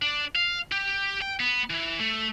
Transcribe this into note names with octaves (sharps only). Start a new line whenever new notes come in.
D4
F5
G4
G5
B3
E3
A3